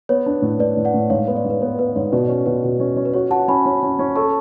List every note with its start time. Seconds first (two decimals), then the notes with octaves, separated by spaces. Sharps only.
0.09 B3 C#5
0.26 D4
0.42 A2
0.59 A2 B4 D5
0.77 A2
0.85 D5 F#5
0.94 A2
1.10 G#2 C#5 F5
1.28 B3
1.35 B4 D5
1.45 G#2
1.50 B4
1.61 B3 C#5
1.79 B3 B4
1.96 G#2 C#5
2.12 B2 B4 D5
2.25 D5
2.29 C#4 C#5
2.46 B2 B4
2.64 B2
2.80 C#4
2.97 C#4
3.05 B4
3.14 F#4 C#5
3.31 F#4 F#5 A5
3.48 C#4 G#5 B5
3.66 C#4
3.83 C#4
3.99 C#4
4.16 A4 A5 C#6